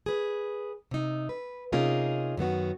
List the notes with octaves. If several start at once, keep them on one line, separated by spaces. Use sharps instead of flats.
G#4 B4
C3 D#4
B4
C3 A#3 C#4 D#4 F4 G#4
F#2 D#3 B3 F#4